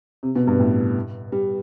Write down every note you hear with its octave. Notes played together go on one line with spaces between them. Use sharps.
C3
B2
G2
A2
G3